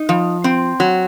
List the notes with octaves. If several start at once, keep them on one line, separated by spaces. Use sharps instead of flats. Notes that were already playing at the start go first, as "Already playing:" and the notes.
Already playing: D#4
F3
C4
F#3